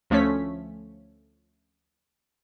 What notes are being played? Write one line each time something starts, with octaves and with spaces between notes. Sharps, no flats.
D2 F3 A3 C#4 C#5 B6